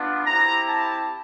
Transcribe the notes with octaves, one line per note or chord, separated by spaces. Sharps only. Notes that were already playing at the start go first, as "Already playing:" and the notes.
Already playing: B3 D4 F4
C4 E4 G4 A#5
A5